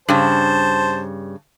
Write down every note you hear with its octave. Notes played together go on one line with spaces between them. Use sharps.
G2 C#3 C5 A5